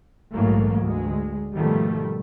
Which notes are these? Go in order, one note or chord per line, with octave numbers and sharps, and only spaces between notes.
A#1 G#2 E3 F#3 A3 A#3
D2 G#3
G#2 B2 D#3 F3 G3 A3